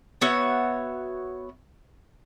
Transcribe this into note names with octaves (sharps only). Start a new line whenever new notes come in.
B3 F#4 C#5 E5